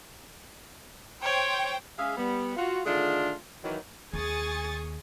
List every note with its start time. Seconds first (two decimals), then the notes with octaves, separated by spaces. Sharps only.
1.22 C5 C#5 G5
1.98 G#3 C#4 G#4 E5 F5
2.17 G3 B3
2.57 F4 F#4
2.85 D3 D#3 A3 D4 F4 G#4
3.64 D#3 E3 F#3
4.13 D#2 G#4 G#5 C#6 D#6 A6